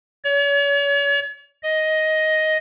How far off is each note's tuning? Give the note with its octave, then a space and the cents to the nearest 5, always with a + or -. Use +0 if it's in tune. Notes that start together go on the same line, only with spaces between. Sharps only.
C#5 +40
D#5 +10